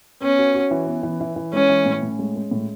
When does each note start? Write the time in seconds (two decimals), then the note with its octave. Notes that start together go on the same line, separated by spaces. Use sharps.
0.22 B3 C#4
0.39 F#4
0.55 F#4
0.71 E3
0.87 B3
1.03 E3
1.21 E3
1.36 E3
1.53 G#3 C#4
1.70 E3
1.86 A2
2.02 A2
2.19 G#3
2.36 G#3
2.51 A2